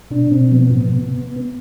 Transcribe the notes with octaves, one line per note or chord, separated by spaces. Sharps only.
B2 D4
B2 C4
F3 B3
A2
C3